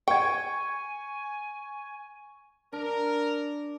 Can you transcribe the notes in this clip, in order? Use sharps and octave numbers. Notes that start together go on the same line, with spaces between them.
G5 G#5 C#6 G#6
D4 A#4